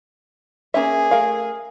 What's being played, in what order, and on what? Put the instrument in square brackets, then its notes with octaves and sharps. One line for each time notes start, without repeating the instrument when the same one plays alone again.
[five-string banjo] A#3 C#4 E5 [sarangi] G#4
[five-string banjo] A3 A#4 F5